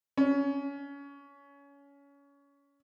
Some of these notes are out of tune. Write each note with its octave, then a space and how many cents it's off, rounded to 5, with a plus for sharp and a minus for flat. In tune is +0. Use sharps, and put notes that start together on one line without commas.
C#4 +25